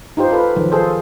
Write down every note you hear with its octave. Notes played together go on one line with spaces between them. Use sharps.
D#4 F4 G4 C5
F4 A4 B4
D#3 F3 F#3
F4 G#4 A4 C5